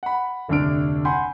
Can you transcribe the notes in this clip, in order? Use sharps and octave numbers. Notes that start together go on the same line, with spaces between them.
F#5 B5
F1 D2 D3 D4 F6 D7
F#5 G#5 B5 C6 G6